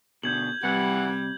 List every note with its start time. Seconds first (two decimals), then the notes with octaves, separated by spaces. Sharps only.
0.23 B2 D3 G6 G#6 F#7
0.63 C3 E3 G3 F#5